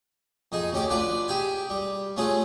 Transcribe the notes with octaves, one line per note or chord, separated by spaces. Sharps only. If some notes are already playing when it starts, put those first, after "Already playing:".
F2 D#4 G#4
D2 C#4 G4 D6
D4 F4 B4 D5
G4 G#4 G5 G#5
G3
A3 C#4 F4 G#4